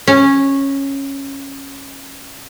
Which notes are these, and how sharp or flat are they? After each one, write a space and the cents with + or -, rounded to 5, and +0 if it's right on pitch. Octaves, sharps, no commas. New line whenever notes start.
C#4 -10